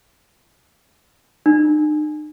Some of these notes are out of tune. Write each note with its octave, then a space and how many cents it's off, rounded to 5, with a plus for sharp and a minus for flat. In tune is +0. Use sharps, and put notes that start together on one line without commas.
D#4 -45